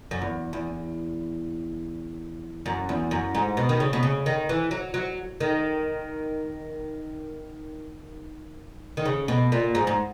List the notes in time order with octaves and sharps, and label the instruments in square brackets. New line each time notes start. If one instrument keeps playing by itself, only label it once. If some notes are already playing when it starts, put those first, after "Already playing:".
[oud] F#2
E2
E2
F#2
E2
F#2
G#2
B2
D#3
C#3
B2
C#3
D#3
E3
F#3
F#3
D#3
D#3
C#3
B2
A#2
G#2
G#2